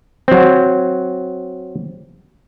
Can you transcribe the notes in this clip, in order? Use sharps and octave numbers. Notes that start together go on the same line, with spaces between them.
F#3 C4